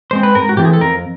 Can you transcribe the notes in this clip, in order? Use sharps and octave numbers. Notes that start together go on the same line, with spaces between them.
G#3 C4 C5
B4
G#2 A#4
F#4
E3 A3 C4 G4
G#4
A4
F2 A#4